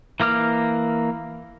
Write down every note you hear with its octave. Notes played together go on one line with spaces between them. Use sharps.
E3 A#3 D6 F6